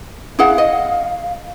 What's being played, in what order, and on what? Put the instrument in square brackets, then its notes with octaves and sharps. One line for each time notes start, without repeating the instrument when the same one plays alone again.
[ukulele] E4 G#4 F#5 [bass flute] F5
[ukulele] D#5